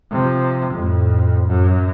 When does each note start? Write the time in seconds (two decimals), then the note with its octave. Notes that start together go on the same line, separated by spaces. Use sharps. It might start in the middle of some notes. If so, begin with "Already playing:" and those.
0.11 C3 F3
0.73 F2 A2
1.48 F#2